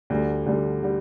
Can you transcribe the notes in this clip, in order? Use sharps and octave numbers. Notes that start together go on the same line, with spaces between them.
D2 D3 G3
D2 D3 G3
D3 G3